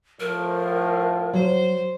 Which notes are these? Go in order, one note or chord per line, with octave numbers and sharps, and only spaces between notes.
A2 F3 A#4
F#3 C5